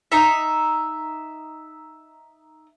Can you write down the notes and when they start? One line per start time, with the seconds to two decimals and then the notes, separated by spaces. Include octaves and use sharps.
0.12 D#4 E5